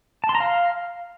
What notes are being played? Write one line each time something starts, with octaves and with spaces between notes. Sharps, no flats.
A5
C6
A#5
F5